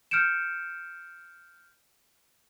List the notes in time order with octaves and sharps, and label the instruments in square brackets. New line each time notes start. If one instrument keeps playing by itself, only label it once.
[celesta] F6 G6 C#7 D7 E7